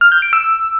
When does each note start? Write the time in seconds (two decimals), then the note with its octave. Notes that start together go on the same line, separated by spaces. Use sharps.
0.01 F6
0.12 G6
0.22 D7
0.33 E6